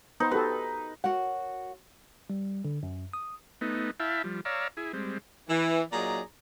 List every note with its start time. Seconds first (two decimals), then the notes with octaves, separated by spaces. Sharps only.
0.20 B3 D#4 B4 C5
0.31 F#4 G4 A4 B4
1.04 F#4 A#4 C#5 F#5
2.30 G3
2.65 D3
2.83 F#2
3.13 D#6
3.61 A3 B3 D#4
4.00 E4 E5 F5 G5 A5 B5
4.24 F3 G3
4.45 C#5 D5 F5 A#5 E6
4.77 E4 G#4
4.93 G3 G#3 C4
5.49 E3
5.92 A#2 F#3 D#4 G#4 D5 A#5